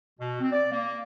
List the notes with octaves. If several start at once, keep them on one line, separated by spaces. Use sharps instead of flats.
B2
C4
D5
A#3